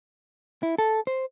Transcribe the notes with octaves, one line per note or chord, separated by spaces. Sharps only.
E4
A4
C5